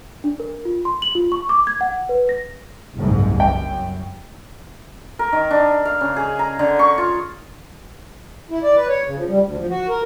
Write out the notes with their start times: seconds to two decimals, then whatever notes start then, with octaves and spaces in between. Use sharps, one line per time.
0.24 D4
0.40 A#4
0.65 F4
0.85 C6
1.02 F#7
1.15 F4
1.32 C#6
1.49 D6
1.67 G#6
1.81 F#5
2.09 B4
2.29 A#6
2.95 F#1 C2 G#2
3.40 F#2 G5
5.19 A#4
5.33 D#3
5.51 D4
5.86 F5
6.01 C#3
6.16 G#4
6.39 A#5
6.59 D3
6.79 C#6
6.98 F4
8.51 E4
8.63 D5
8.76 B4
8.88 C#5
9.05 C#3
9.17 F3
9.28 G3
9.42 D2
9.58 F3
9.70 F#4
9.89 A#4